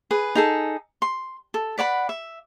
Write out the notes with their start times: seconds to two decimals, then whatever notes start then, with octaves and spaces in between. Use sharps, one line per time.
0.11 G#4 B4
0.35 D#4 G#4 A4
1.02 C6
1.54 A4
1.78 B4 D5 F#5 B5
2.09 E5